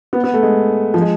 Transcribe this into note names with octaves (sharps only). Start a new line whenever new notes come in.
B3
B3
A3
G#3
F3
G#3